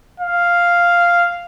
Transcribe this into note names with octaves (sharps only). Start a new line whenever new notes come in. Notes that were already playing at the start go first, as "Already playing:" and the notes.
F5